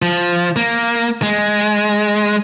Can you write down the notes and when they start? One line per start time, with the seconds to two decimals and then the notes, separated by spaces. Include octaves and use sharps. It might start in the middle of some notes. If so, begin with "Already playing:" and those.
0.02 F3
0.56 A#3
1.22 G#3